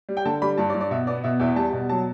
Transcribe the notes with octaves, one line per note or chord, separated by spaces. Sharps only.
G3
G5
D3 A5
G3 B5
G2 A5
D5
G2
D5
B2 E5
B3 D5
B2 E5
E2 E5
G3 A5
B2
F#3 A5